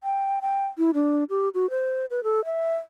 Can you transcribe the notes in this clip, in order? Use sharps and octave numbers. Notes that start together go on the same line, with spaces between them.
G5
G5
E4
D4
G4
F#4
C5
B4
A4
E5